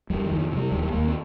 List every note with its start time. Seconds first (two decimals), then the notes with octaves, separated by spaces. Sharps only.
0.10 F2 G3
0.26 D#3
0.31 F2
0.41 F3
0.51 C3
0.57 G3
0.72 D#2 G3
0.82 G3
0.92 D#2 A#3
1.08 C4